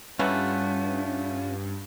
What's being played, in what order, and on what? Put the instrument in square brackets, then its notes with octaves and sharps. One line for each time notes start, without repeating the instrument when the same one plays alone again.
[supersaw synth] G2 [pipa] E3 F#3 A3 [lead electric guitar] C#4 [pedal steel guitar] F4 E5 F#5